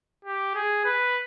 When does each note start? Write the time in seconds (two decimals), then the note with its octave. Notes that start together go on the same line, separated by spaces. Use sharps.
0.25 G4
0.55 G#4
0.85 B4